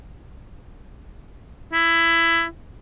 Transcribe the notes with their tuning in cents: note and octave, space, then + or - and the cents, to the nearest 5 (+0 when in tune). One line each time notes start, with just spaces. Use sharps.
E4 +15